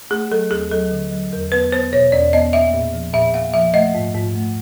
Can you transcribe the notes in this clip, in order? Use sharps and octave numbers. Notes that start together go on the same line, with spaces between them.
A3 G#4
F#3 A4
D#2 G#4
F#3 A4
D3
F#3
E2 A#4
B3 B4
B3 C5
B2 C#5
E2 D5
B3 D#5
A#3 E5
A#2
F3
A#2 E5
A#3 F5
F3 E5
A3 D#5
G#2
G#2
A3